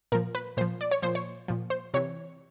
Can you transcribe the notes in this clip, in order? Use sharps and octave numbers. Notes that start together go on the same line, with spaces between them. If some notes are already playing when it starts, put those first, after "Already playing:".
A#2 F3 A#4
B4
A#2 F3 C5
D5
C#5
A#2 F3 C5
C#5
A#2 F3
C5
C3 E3 C#5